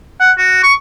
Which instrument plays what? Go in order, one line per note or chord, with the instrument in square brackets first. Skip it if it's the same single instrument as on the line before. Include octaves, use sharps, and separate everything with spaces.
[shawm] F#5
F#4
C#6